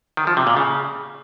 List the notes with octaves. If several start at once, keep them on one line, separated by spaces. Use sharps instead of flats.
D#3
F3
C3
A#2
C#3